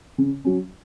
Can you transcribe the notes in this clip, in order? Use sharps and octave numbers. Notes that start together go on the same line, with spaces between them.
C#3
F#3 C#4